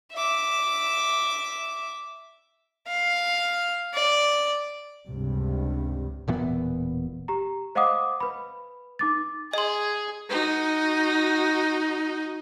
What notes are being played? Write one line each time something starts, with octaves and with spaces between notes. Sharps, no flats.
E5 D6
F5
D5
C#2 G2 C3
E1 A#2 E3 B3
G4 A#5
C5 D#5 F5 F#5 D6 D#6
B4 B5
D#4 D6 A6
G#4 D#5 C6
D#4 F#4